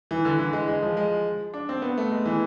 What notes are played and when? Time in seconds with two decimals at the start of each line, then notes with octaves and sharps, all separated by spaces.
0.11 E3
0.25 D3
0.39 E3
0.53 G#3
0.68 G#3
0.83 F3
0.97 G#3
1.54 D4
1.69 C4
1.82 B3
1.98 A3
2.11 G#3
2.26 E3